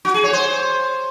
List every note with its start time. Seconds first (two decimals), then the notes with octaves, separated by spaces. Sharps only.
0.05 F#4
0.14 G#4
0.24 C#5
0.33 C5